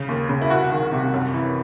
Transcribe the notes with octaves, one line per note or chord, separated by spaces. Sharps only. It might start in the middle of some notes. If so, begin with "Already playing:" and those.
Already playing: C#3
D#2
C#3
E4
C2 F#4
D#3
C3
F#2
E3